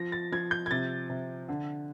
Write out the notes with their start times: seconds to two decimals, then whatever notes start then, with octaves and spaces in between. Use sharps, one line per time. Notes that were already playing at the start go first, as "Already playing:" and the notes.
Already playing: F3 A#6
0.12 A6
0.32 F3 G#6
0.51 G6
0.66 G#6
0.71 C3 A6
1.09 C3
1.49 D3